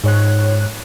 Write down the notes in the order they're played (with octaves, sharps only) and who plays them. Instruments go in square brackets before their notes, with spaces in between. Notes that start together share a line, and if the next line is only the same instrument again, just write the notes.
[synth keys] G#2 C#5 F#6